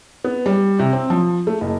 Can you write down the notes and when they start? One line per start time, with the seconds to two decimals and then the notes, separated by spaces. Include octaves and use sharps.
0.24 B3
0.46 G3
0.79 C3
0.93 C4
1.10 F3
1.47 A3
1.61 F#1